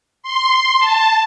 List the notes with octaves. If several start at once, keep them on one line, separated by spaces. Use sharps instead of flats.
C6
A5